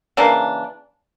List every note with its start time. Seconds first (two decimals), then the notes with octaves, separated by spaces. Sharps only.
0.17 C#3 E3 A#3 D4